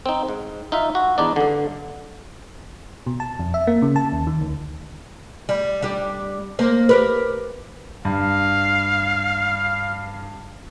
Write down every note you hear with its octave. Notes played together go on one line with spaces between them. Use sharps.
C4 D#4
G#2
D#4 F4 E5
F#4
E2 D4 D#4 D5
G2 D3
B2
A5
F2
E5
A#3
C#3
A5
D#2
D#3
D2
G3
G3 D4 G4
A#3 C5
G4 A#4 B4
G2 F5